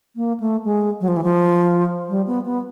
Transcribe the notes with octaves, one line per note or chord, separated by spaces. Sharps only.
A#3
A3
G#3
F#3
F3
E3
F3
G3
B3
B3